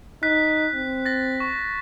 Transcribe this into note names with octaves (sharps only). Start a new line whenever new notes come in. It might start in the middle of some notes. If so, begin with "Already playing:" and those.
D#4 F#6 B6
C4
A6 A#6
C#6